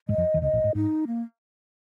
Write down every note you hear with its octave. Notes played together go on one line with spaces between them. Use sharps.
G#2 G#3 D#5
F2 F3
D#2 D#3
C#2 C#3 D#5
A#1 A#2
G#2
G#2 D#4
A#3